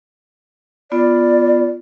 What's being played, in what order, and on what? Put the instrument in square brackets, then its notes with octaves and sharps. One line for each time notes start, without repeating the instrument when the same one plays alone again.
[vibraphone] B3 F4 [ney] D5